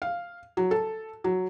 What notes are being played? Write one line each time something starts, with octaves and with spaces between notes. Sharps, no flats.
F5
F#3
A4
F#3